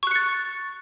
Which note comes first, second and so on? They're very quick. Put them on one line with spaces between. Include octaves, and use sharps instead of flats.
C#6 F#6 C#7 A6